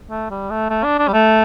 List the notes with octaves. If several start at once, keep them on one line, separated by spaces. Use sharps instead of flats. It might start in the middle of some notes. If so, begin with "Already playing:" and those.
A3
G3
A3
A3
D4
D4
G3
A3